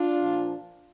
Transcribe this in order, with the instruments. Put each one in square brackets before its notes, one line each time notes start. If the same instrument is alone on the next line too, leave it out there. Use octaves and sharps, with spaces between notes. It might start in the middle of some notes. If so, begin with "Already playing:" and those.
Already playing: [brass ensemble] D4 F4
A#2 F3